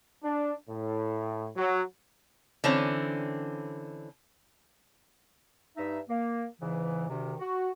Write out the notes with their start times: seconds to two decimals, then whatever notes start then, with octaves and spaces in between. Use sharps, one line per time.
0.23 D4
0.69 A2
1.56 F#3
2.64 D3 E3 C4 C#4
5.76 G2 D#4 E5
6.09 A#3
6.60 E2 G#2 C#3 E3
7.09 D2 C3 D#3
7.39 F#4